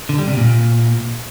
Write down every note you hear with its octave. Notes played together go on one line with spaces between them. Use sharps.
D3
G3
C3
A#2